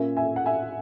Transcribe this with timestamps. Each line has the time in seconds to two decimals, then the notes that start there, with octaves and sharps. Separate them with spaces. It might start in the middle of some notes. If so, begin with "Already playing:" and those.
Already playing: A#2 A#3 C#4 E5 G#5
0.17 E5 G#5
0.36 F#5
0.46 E5 G#5